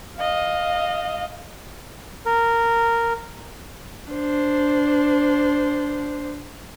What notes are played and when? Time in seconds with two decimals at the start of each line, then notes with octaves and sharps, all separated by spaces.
0.17 D#5 F5
2.26 A#4
4.12 D4 C5